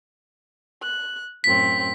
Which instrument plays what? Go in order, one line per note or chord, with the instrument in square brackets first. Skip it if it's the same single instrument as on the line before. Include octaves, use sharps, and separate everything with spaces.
[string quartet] F#6
[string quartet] F#2 A2 C4 [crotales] B6